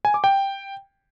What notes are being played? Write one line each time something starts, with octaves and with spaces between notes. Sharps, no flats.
G#5
D6
G5